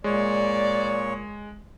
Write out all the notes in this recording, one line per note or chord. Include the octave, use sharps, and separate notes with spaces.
A#2 G#3 C#5 D5